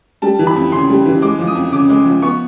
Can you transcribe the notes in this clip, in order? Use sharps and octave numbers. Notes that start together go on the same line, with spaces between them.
G3 A5
E3
B5
F2
C#3 C6
G3
E3
G#3 D6
F3
D#6
F2
C#3 D6
G#3
F3
B3 C#6